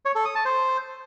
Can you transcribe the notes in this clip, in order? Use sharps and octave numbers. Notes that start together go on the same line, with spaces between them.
C#5
A4
D#6
A5
C5